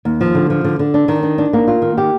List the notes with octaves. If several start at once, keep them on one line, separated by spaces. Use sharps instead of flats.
D#2
F3
D3
F3
D3
D3
D4
D#3
D4
D4
A#3
F4
D#3
G4